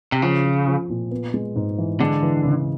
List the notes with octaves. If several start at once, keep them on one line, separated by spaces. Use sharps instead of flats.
C3
C#3 F3
F3
F3
A#2
B3
G#3
G#2
E3
D3 G#3
E3
C#3